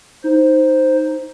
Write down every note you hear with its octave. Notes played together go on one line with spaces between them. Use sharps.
D#4 C5